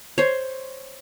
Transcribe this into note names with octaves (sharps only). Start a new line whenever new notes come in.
C5 C#5